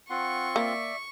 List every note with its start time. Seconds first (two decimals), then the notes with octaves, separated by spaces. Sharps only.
0.10 C4 F4 F#5 C6 C#6
0.56 A#3 D5 E5